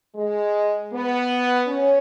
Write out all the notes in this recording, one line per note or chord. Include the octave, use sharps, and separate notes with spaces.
G#3
B3
C#4